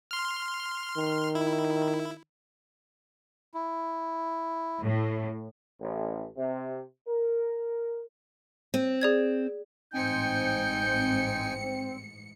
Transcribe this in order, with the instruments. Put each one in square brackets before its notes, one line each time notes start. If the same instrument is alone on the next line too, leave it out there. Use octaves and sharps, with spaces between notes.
[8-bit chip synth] C6 F6
[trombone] D#3
[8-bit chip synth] E4
[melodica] E4
[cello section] A2
[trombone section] A1
C3
A#4
[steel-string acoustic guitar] C4 [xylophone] D#7
[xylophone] G#4 D5 G#6
[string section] A1 G#2 C#7 [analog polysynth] C4 [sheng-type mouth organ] D#4 G5 G#5 [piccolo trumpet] G6